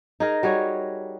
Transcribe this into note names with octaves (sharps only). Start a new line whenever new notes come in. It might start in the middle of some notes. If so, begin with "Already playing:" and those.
D#4 G#4 A#4
G3 F#4 G#4 C#5